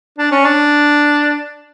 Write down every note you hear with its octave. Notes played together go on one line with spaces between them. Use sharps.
D4
C#4
D4